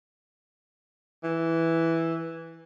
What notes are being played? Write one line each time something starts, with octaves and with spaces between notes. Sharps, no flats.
E3